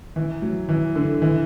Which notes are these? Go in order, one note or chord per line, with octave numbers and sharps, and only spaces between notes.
E3
F#3
E3
D3
E3